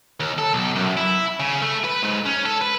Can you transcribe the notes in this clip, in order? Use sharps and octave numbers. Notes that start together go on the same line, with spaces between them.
D#2
A4
B1
F#2
E4
C#3
A3
B4
G#2
C#4
A4
B4